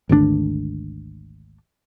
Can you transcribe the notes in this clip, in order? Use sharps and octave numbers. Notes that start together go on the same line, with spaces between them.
G#1 D2 C#3 D4